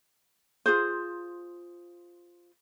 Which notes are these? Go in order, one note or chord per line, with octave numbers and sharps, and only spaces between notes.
F4 G#4 C5